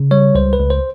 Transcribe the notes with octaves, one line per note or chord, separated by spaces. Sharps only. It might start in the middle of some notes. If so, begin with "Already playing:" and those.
Already playing: C#3
G3 C#5
C#2 C5
B4
C#2
C5